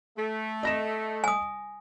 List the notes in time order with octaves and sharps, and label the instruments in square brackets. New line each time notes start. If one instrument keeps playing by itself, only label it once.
[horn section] A3
[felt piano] D#5 A#6 E7
[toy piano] G#5 D#6